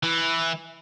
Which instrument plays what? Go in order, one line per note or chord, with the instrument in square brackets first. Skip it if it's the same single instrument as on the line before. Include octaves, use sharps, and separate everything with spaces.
[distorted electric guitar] E3